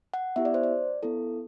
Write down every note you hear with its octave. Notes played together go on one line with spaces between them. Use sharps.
F#5
B3 E4 G4 E5
D5
C5
D5
B3 E4 A4